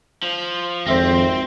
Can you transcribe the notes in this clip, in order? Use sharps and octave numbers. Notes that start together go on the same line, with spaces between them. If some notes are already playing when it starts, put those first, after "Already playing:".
F3
G#1 F2 C4 C5 E5 A#6